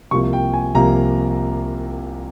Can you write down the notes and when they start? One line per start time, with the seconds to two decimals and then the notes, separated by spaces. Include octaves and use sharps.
0.11 C2 C3 F3 A#3 C#6
0.33 G5
0.53 G#5
0.75 C2 C3 F3 A#3 A#5